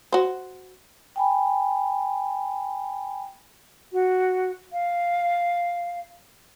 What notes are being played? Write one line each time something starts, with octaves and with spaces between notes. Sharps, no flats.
F#4 C5
G5 G#5 B5
F#4
F5